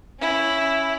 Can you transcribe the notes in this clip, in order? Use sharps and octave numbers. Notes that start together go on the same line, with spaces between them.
C#4 E4